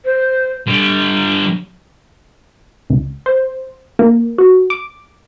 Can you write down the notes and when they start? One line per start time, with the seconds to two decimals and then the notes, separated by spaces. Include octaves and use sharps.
0.05 C5
0.67 D3 G3
2.90 C#2
3.26 C5
3.99 A#3
4.38 F#4
4.70 D6